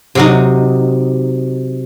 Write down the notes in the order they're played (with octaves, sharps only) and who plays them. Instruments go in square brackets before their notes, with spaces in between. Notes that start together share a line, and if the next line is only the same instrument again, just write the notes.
[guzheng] C3 F#3 D#4